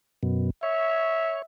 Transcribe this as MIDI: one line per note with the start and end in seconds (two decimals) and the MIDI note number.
0.23 0.50 42
0.23 0.50 47
0.63 1.42 73
0.63 1.44 76